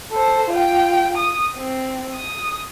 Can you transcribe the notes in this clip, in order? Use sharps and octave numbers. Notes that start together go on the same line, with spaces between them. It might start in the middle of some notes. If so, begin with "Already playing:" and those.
A4 C5
F4 G5
D#6
C4
D#6